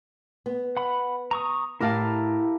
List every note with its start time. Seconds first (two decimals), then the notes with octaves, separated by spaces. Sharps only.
0.46 B3
0.77 F#5 B5
1.31 A#5 C#6 D#6
1.81 A2 E4 G4 A#4 F5 A5